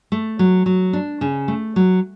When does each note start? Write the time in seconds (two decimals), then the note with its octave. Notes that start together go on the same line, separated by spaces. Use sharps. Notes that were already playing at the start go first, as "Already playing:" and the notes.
0.12 A3
0.39 F#3
0.66 F#3
0.93 D4
1.21 C#3
1.48 A3
1.76 F#3